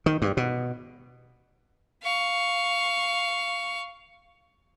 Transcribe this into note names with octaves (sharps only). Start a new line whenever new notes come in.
D#3
G2
B2
F5 C#6